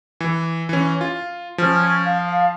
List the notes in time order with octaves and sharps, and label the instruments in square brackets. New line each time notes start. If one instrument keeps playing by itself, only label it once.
[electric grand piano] E3
E3 C#4
F4
[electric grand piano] F3 [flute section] C#4 F6
[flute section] F5